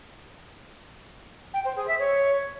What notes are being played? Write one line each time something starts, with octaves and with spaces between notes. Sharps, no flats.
G5
C5
G#4
E5
C#5